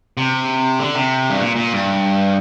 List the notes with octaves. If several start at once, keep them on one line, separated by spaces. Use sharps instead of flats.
C3
D3
C3
G2
A#2
A#2
G2